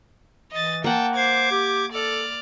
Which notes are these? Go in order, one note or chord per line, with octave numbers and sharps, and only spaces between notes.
E3 D#5 A6
A#3 F#5 G5 A5
C5 D6 G#6
G4
A4 D5 F6